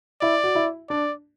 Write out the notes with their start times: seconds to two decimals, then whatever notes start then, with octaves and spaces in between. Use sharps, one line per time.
0.21 E4 D5
0.44 F#4
0.55 E4
0.89 D4 D5